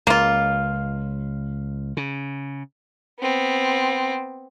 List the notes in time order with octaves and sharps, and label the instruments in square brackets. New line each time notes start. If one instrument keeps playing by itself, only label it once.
[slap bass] C#2 [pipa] A#3 F4
[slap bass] C#3
[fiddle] B3 C4